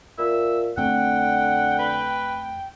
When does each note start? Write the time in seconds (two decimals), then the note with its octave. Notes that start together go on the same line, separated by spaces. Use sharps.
0.18 A#2 E5
0.77 F2 D3 A3 C4 F#5 G5
1.79 B4